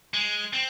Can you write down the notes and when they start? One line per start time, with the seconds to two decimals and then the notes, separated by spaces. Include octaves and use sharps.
0.14 G#3
0.53 C4